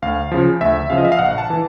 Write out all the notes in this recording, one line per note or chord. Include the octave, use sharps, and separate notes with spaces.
D2 F5
C#3 F3
D2 E5
C#3 F3 F5
D#5
E5
F5
A#1 F#5
A5
E3